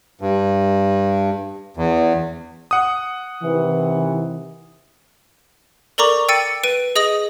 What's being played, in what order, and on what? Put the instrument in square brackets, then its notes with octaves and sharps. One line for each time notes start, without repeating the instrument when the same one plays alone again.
[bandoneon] G2
E2
[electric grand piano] F#5 D#6
[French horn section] C3 D#3 E3
[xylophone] A4 A#4 D5 A#5 C#6 D6
G5 E6 A6 C#7 D#7
B4 D7 D#7
G#4 D#5 D#6 A#6 F#7